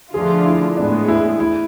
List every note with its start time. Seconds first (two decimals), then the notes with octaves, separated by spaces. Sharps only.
0.14 D3 F3 A3 D4 F4 G#4
0.46 E4
0.77 A2 G#3 B3 D4
1.08 E4
1.40 E4